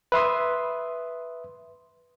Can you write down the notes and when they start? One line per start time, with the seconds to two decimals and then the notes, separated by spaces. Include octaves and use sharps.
0.12 B4 E5 C6 D#6